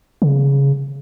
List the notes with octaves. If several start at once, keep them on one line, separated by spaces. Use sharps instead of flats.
C#3